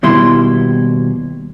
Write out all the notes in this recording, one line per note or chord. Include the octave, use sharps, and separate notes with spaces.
D#2 B2 G3 E4 C6